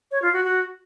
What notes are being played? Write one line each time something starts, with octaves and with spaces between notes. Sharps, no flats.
C#5
F4
F#4
F#4